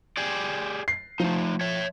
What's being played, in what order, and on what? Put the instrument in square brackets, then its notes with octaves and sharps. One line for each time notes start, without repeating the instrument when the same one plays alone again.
[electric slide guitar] G4 G#4 D5
[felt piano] C7
[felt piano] F3 [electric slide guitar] A3 D#4
[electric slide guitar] C#5 E5